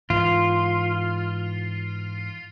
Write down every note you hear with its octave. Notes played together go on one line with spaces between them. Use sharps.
G#2 E3 F4